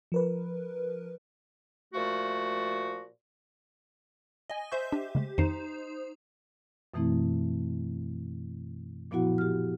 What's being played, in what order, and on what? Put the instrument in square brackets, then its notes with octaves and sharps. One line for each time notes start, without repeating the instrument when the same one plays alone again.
[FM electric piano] F3 A#4 B4
[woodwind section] A#2 F3 A3 F#4
[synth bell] D#5 G#5
[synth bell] C5 E5 G6 [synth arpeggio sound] C#6
[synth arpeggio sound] D4 [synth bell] G4
[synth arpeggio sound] C#3 G#3 A3
[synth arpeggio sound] F2 D#3 C7 [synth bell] D#4 C5
[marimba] F#2 B2 E3 A3 C4 E4
A#2 F3 B3 E4 F#4 F#5
G4 F6